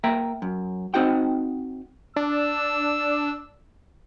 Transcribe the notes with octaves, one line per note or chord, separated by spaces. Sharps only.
A#3 E5 G5 A#5
F#2
C4 D#4 F#4 F#5 G5
D4 E6